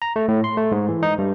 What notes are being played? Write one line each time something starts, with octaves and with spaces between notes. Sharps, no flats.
A#5
A3
A2
C6
A3
G#2
E3
D#4
G2